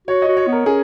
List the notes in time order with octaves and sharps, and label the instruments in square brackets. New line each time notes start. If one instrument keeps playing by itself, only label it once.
[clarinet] F#4 [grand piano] C#5
[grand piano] D#5
[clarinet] F#4
[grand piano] C#5
[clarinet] B3
[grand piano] A#4
[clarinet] C#4 [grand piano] G#4